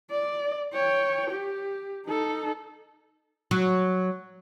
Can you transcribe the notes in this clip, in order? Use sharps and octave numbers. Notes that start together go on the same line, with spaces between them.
D5
C#5 G5
G4
D#4 A4
F#3